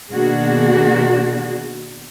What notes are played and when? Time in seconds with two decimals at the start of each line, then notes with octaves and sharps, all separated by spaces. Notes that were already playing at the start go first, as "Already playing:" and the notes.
0.13 B2 D#3 A#3 D4 F#4 G#4